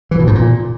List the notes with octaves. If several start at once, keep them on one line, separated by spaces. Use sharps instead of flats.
E3
B2
G#2
A#2